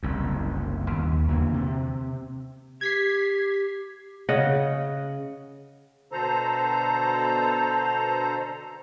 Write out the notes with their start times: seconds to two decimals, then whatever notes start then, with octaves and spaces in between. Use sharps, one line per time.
0.03 F#1 C2 F#2
0.92 D#2
1.28 E2 D3 E3 A#3
1.54 C3
2.81 G4 G#6 B6 C7
4.29 C#3 D#5 F#5
6.12 B2 D3 A4 C5 A#5